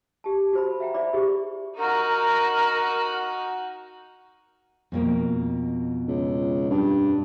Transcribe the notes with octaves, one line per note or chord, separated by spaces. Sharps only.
G4 A5
F#4 C5 B5
E5 F#5 G5 A#5
E4 C5 D5 E5 B5 D6
E4 G4 G#4 C#6
D#4 F#4 A#4
F2 B2 A#3
C#2
G2